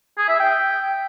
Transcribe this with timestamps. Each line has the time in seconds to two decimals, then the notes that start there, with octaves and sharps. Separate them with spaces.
0.18 G#4
0.29 E5
0.40 G5